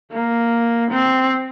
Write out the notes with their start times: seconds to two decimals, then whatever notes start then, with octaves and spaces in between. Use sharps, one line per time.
0.12 A#3
0.91 C4